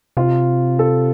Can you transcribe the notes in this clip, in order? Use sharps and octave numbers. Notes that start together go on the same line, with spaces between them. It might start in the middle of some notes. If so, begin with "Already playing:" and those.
C3 F4
A4